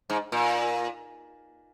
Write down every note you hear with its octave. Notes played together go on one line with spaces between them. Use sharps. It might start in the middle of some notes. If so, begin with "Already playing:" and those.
G#2
A#2